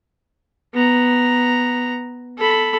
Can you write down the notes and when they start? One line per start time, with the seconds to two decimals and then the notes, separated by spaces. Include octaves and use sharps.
0.74 B3 A#5
2.38 A4 B5